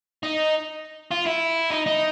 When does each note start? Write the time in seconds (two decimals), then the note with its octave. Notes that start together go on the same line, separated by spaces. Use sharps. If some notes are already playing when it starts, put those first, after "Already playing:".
0.23 D#4
1.12 F4
1.27 E4
1.71 D#4
1.86 D#4